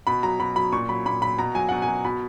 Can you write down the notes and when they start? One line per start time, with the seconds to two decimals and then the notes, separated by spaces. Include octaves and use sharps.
0.07 B2 B5
0.23 F#3 A#5
0.40 B2 B5
0.56 F#3 B5
0.72 A#2 C#6
0.89 F#3 B5
1.06 A#2 B5
1.22 F#3 B5
1.38 B2 A#5
1.55 F#3 G#5
1.69 B2 F#5
1.82 G#5
1.88 F#3
2.05 B2 B5